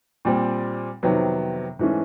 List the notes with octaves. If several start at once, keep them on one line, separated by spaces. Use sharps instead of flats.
A#2 G3 C4
F2 C3 D#3 F#3 B3
G#2 E3 A3 C#4